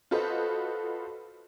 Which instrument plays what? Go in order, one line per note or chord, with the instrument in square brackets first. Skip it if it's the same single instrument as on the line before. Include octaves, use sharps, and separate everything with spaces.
[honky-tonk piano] F4 F#4 A4 B4 C5 D#5